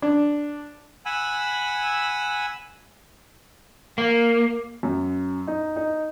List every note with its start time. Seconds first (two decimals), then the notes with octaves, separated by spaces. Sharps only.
0.02 D4
1.06 F#5 G#5 B5 E6
3.98 A#3
4.83 F#2
5.47 D#4
5.76 D#4